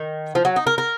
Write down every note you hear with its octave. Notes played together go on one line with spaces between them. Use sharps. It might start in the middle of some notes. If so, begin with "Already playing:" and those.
Already playing: D#3
F3
F#3
D#4
A#4
A#4